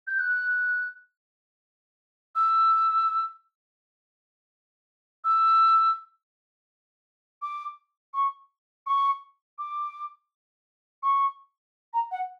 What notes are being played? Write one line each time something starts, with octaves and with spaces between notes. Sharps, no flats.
G6
F#6
E6
E6
D6
C#6
C#6
D6
C#6
A#5
F#5